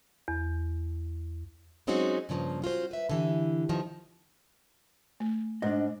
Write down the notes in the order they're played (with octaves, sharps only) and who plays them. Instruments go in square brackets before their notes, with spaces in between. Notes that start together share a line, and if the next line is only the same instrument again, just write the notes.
[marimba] E2
[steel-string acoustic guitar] F#3 G#3 C4 C#4 D#4 F#4
G2 C#3 F3 A3 A#3
C#4 F4 F#4 C5
B4 E5
D3 E3 G4
B2 D#3 F3
[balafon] A3
[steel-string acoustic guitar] G#2 [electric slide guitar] D4 D#5